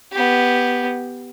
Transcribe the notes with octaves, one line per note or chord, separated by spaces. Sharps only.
B3 G4